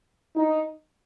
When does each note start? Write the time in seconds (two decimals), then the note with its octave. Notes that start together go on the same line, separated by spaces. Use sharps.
0.35 D#4